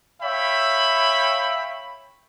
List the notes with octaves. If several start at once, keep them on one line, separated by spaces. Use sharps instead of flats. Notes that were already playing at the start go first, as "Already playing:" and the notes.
C#5 E5 F5 G5 B5